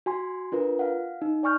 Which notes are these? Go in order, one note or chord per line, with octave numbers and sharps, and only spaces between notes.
F#4 G#5 C6
D4 F4 A#4 B4
F5 F#5
D#4
D5 G#5 C#6 F6 G6